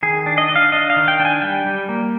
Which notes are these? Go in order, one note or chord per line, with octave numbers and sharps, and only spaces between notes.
D#3 G#4
D4
D#5
D4
F5
D4 D#5
F5
D#3
G5
D4
G#5
G3 G5
G3
A#3